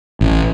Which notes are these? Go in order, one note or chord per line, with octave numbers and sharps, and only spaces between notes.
A1